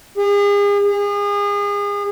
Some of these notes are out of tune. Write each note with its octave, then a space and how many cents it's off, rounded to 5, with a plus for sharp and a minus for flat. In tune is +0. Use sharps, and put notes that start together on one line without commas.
G#4 -40
G#4 -35